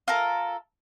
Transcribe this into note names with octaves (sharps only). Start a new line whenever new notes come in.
F4 A4 A#4